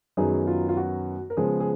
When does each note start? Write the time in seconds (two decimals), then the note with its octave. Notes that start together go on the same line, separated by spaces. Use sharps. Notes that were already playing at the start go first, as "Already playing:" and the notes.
0.17 F#2 D#3 F#3 B3 D#4 G#4
0.47 F4
0.69 F4
0.77 F#4
1.30 A#4
1.37 C#3 F3 G#3 B3 G#4
1.60 G#4